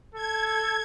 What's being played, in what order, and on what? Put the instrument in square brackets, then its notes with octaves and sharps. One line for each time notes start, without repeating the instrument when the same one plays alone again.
[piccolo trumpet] A4 [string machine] G#6